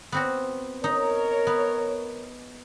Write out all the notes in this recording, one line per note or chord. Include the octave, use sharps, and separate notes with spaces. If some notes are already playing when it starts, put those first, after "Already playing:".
B3 C4 F#4
D#4 A#4 C#5
B3